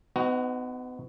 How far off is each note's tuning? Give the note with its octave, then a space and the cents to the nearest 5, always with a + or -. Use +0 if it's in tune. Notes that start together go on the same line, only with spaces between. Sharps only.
B3 +35 D#4 +0 F#4 +0